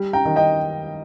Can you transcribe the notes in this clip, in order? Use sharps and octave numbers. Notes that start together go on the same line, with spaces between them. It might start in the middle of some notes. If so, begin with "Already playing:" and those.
Already playing: G3
G5 A#5
D#3
D#5 G5